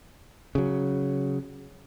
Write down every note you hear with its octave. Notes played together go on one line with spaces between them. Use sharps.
C#3 F#3